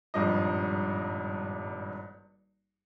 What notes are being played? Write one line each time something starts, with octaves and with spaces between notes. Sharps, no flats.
D#1 G#1 G2 F3 D#5